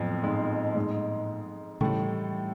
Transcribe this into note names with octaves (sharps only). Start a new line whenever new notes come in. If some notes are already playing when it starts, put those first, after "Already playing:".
Already playing: F2 A2 F3 F#3 B3
G#2 G#3
G#2 G#3
A2 C#3 E3 G3 A3